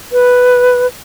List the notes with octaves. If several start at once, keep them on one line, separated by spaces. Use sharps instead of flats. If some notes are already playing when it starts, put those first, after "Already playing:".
B4